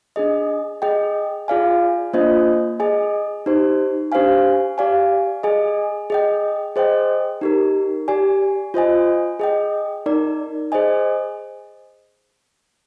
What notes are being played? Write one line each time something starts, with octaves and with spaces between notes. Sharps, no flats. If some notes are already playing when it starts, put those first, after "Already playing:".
D4 G#4 D#5
G#4 D#5 G5
F4 G#4 D5 F5 G#5
A#3 D4 F4 C5 D#5
G#4 D#5 G#5
D#4 G4 C5
D4 G4 C5 F5 G#5
G4 D5 F5 G#5
G#4 D#5 G#5
G#4 D#5 G5
G#4 C5 D#5 G5
D#4 G4 A#4
G4 D5 G#5
F4 C5 D#5 G#5
G#4 D#5 G5
D#4 A#4 D5
G#4 C5 D#5 G#5